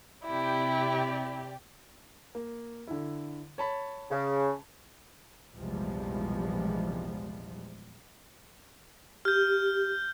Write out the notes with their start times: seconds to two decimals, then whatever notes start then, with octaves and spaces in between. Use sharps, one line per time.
0.25 C3 E4 G4 D5
2.35 A#3
2.87 D3 E4
3.58 C#5 A5 B5
4.11 C#3
5.53 A#1 E2 C3 F3 G3 G#3
9.25 G4 F6 G6